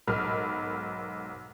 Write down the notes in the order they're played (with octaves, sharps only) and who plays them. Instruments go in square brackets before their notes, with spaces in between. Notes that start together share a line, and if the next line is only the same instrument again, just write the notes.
[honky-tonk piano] B1 G#2 A#4 B5 F6